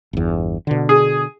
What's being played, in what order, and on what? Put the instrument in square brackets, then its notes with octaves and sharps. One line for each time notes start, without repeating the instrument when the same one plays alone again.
[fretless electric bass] G1 E2
B2 D3
[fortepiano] G#4